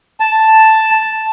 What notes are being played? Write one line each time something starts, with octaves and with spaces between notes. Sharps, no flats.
A5